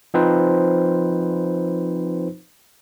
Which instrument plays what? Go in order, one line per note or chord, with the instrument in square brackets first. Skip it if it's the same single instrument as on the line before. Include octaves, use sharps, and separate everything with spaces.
[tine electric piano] F3 C4 D#4 B4 C5